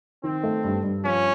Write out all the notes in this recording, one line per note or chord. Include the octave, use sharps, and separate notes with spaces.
D#3 C4
A3
G2
G2
F3 C#4